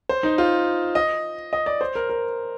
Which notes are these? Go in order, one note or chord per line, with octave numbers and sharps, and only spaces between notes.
C5
D#4
F4
D#5
D#5
D5
C5
A#4
A#4